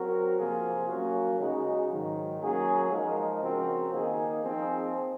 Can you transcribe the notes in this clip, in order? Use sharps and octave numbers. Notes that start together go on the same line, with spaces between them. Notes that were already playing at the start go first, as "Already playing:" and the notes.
Already playing: F#3 C4 F#4 A#4
C3 F3 A#3 F4 G#4
F#3 A#3 C#4 F#4
C#3 G#3 D#4 F#4
G#2 D#3 F#3
F#3 A#3 C#4 G#4
F3 G#3 D#4 A#4
C#3 F3 C4 F#4 A#4
D#3 A#3 D#4 G#4
F3 C4 D#4 G#4